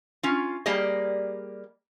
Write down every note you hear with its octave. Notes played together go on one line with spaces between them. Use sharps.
C#4 F4
G3 A#3 G4 G#4 D5 D#5